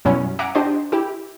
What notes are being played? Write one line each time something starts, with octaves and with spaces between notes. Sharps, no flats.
F#2 B2 F#3 G3 C#4 E4
E5 F#5 G#5 A#5 D6 D7
D4 G4 C5 D#5
E4 G4